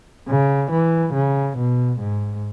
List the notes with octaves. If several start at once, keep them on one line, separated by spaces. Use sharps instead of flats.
C#3
E3
C#3
B2
G#2